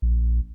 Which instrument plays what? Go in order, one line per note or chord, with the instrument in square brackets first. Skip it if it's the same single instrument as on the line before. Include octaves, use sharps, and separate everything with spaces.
[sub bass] A#1